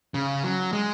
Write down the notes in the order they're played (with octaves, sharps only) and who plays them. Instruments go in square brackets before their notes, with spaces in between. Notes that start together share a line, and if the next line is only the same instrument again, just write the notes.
[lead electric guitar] C#3
F#3
G#3